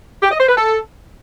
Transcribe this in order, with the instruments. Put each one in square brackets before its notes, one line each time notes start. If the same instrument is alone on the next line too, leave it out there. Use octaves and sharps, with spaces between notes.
[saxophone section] G4
D#5
C5
B4
A4